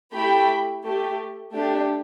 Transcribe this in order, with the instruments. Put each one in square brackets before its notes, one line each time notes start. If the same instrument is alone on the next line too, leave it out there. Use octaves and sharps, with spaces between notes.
[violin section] A3 E4 G4 G5 B5
A3 G4
A3 D4 G4